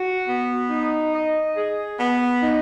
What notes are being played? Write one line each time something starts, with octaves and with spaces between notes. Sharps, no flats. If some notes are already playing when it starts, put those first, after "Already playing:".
Already playing: F#4
B3
D#4
D#5
G#4
B3
D#4